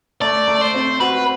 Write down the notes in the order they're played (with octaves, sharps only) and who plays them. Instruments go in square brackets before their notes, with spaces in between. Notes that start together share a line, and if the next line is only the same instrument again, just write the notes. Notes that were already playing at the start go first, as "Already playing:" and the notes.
[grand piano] A3 [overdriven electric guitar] D5
[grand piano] A3
[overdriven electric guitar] C5
[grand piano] C4
[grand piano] F#4 [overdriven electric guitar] B4